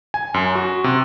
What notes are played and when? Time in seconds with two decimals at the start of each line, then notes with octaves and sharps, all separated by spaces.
0.14 G#5
0.34 F#2
0.55 F#4
0.84 C3